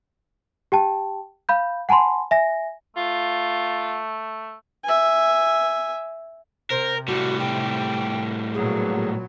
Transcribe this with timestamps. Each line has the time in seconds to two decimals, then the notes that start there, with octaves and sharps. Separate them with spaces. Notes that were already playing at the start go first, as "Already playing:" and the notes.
0.72 G4 G5 A5
1.49 F5 B5 G6
1.89 F#5 G#5 A5 B5 C6
2.31 E5 G#5 A#6
2.97 A3 F4
4.84 E5 G#5
6.70 C3 A#4 C5
7.08 A2 G3 F#4
7.39 G5
8.54 A#2 F#3 B3 G#4